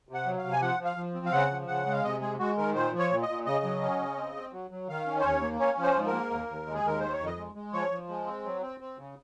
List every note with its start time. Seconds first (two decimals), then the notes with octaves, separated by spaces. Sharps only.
0.09 C3
0.14 F#5
0.26 F#3
0.38 F5
0.44 C3
0.53 G#5
0.61 F3 F#5
0.79 F3
0.85 F5
0.97 F3
1.14 C4
1.26 F5
1.32 C#3 F#5
1.51 F3
1.68 C#3 F#5
1.86 G#3
1.93 F5
2.03 C3 D#5
2.21 G#3 G#4
2.39 G#3 F#4
2.57 D#3 A#4
2.75 A#2 C5
2.93 F3
2.99 C#5
3.11 A#2
3.22 D#5
3.28 A#2
3.46 C#3 D#5
3.64 F#3
3.82 C#4
3.99 C#3
4.17 C4
4.35 C4
4.52 F#3
4.71 F#3
4.89 D#3 F5
5.07 C#4
5.20 C5
5.24 D#2 C#5
5.42 A#3
5.59 C#4 C#5
5.77 F3
5.83 C5
5.96 G#2
6.07 A#4
6.13 A#3
6.31 D#2
6.48 D#2
6.67 G#3
6.74 G#4
6.83 D#2 A#4
7.00 D#3 C5
7.12 C#5
7.20 F2
7.26 D#5
7.38 G#3
7.55 G#3
7.73 F3 C#5
7.91 F3
8.09 G#3
8.26 C4
8.45 F#3
8.62 C4
8.80 C4
8.98 C#3